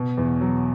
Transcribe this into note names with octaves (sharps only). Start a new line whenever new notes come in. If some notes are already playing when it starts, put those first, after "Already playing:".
Already playing: B2
E2
F#3